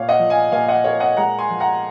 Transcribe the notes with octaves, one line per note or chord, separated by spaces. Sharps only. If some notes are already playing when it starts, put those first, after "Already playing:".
Already playing: A#2 C#5 F5
D#5 F#5
F3
F5 G#5
A#2 F5 G#5
D#5 F#5
A#3 C#5 F5
D#5 F#5
G#3 F#5 A#5
G#5 C6
F3
F#5 A#5